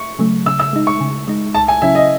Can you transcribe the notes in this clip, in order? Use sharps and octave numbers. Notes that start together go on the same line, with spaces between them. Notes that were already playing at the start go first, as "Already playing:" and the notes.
Already playing: C#6
C#3 F#3 A3
C#3 E6
E6
G#3 D#4
C#6
C#3
G#3 D#4
C#2 A5
G#5
C#3 F#3 C#4 E4 E5
D#5